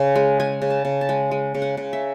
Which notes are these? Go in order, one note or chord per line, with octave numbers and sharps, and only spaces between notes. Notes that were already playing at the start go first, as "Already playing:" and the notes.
Already playing: C#3
G#3
G#3 G#5
C#3
A5
C#3
A5
G#3
G#3
C#3
F#5
C#3
E5